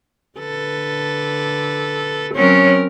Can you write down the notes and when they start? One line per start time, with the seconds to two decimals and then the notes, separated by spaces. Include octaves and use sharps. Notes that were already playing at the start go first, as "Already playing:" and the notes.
0.39 D3 A4 B4
2.35 F#3 C4 C#4 A#4